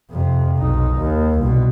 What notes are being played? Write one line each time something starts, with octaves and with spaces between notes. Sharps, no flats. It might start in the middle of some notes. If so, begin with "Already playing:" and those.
F2 C3
B1 D#4
D#2
C2 B2